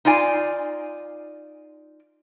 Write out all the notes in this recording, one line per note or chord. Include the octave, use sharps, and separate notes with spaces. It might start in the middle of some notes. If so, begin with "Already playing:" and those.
D#4 F4 D5 G#5